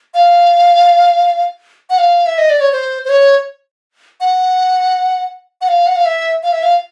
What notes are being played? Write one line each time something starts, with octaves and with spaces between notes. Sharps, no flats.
F5
F#5
F5
E5
D#5
D5
C#5
C5
C5
C#5
F#5
F#5
F5
F#5
F5
E5
F5
E5
F5